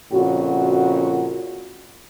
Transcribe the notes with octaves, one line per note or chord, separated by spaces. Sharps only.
F2 A#2 C#3 F#4